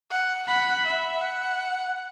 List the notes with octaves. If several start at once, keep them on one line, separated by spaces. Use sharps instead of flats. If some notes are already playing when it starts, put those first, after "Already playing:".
F#5
F#5 B5
E5
F#5